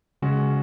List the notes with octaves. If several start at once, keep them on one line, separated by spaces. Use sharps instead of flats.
C#3 G#3 C#4 F#4